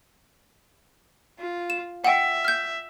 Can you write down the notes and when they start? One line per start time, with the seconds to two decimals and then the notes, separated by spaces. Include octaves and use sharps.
1.39 F4
1.70 E7
2.04 E5 F#5 G5
2.45 F6 G6